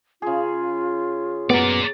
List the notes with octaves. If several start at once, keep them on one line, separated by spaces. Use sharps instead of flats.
C#3 F4 G#4
F#2 A#3 B3 D5